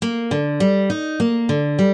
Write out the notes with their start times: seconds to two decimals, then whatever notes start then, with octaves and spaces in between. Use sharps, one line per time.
0.02 A#3
0.31 D3
0.60 G3
0.90 D#4
1.20 A#3
1.49 D3
1.79 G3